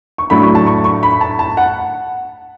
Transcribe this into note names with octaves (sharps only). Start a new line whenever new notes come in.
C#6
A2 F#3 A3 D4 B5
C#6
A5
C#6
C#6
B5
A5
A5
F#5